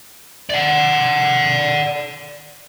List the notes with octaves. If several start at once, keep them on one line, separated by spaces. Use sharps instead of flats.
D5 F#5